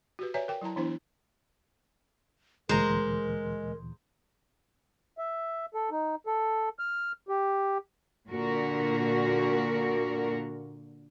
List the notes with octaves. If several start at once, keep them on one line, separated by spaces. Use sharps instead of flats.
F#4 G4 B4
B4 C#5 D5 E5 G#5 A#5
A#4 G5
F#3 E4 A5 A#5
E3 B3 D4 E4 C5
D2 A#2 E3 G#3 A#4 C5 A#5
E5
A4
D#4
A4
F6
G4
A#2 D3 F#4 A#4